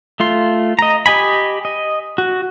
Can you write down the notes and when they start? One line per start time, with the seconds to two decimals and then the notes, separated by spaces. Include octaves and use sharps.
0.20 A3 F4 C6
0.79 D#5 A#5
1.06 G4 D#5 G#5 B5
1.65 D#5
2.18 F#4